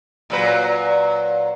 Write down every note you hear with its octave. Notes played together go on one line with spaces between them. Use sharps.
A#2 F#3 B4